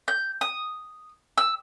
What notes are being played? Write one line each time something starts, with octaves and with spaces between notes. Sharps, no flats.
G6
D#6
E6